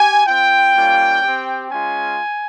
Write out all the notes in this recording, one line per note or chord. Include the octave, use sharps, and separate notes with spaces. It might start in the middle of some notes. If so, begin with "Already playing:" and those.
Already playing: G4 G#5
C4 F4 G5
G3 A#3 C#4 F4
C4 G4
G#3 C#4 F4 G#5